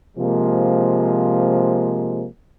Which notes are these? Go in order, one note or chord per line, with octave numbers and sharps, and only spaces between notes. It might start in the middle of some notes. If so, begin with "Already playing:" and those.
C3 F3 G#3 A#3